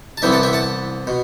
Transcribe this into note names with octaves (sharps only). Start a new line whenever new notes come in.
A5
C2 C3 E3 B3 E5 G5
F#5 A5
E5 G5
F#5 A5
B2